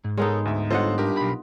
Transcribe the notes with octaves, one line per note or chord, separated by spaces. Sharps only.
G#2
G#3 B3 D#4 A4 A#4 C#5
D2 E5
G1 F4 A4 C5 C#5 D#5 F#5
G2 G4 A#4
B1 B5